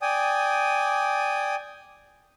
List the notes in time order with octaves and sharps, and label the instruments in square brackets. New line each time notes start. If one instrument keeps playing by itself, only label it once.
[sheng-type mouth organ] D5 G5 G#5 D#6